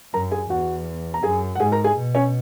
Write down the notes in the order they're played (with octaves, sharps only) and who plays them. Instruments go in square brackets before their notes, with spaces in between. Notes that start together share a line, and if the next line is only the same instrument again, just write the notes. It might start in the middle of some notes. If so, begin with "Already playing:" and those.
[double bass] F#2 [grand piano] A#4 A#5
[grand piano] G#4 G#5
[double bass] E2 [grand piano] F#4 F#5
[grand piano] A#5
[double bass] F#2 [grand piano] G#4 G#5
[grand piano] F#5
[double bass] G#2 [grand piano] G#4 G#5
[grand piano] A#4 A#5
G#4 G#5
[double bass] B2
[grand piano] C#4 C#5